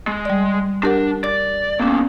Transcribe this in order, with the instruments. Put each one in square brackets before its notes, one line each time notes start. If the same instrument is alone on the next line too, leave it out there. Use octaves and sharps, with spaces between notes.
[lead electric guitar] G#3
[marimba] G3 D5
[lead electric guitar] D4 [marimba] G4 A#4 F#5
[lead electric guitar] D5 [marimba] A6
[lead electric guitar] C#2 A#3 [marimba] B3 C#4